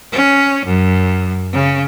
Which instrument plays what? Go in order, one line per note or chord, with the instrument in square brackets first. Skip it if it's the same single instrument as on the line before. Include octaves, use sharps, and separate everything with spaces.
[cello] C#4
F#2
C#3